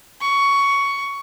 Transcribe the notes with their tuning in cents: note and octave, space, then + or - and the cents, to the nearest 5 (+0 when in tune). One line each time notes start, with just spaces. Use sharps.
C#6 +10